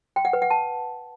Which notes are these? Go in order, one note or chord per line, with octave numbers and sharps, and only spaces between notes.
G5
F#5
B4
F#5
A5